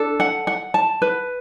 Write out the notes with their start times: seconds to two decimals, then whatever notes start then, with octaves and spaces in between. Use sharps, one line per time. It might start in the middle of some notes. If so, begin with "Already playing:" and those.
Already playing: D4 A4
0.20 F#5
0.47 F#5
0.74 A5
1.02 B4